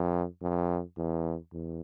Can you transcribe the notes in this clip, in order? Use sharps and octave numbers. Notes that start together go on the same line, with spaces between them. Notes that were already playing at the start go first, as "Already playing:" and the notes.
Already playing: F2
F2
E2
E2